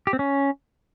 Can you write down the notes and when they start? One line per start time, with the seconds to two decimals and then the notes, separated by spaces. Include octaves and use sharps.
0.07 G4
0.13 C4
0.19 C#4